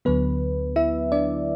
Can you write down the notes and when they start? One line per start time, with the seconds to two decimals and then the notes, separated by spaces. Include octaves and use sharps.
0.05 D2 D3 F#3 B3 B4
0.76 E4 E5
1.12 D4 D5